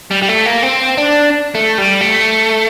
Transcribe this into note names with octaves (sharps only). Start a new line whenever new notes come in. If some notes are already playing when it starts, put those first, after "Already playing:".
G3
G3
A3
A#3
C4
D4
A3
G3
A3